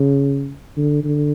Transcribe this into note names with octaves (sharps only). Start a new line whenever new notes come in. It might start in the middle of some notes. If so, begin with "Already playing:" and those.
Already playing: C#3
D3
D3